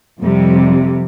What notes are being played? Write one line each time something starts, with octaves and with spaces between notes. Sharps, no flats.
F2 C3 G3